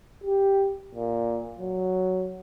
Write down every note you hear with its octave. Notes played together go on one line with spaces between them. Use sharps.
G4
A#2
F#3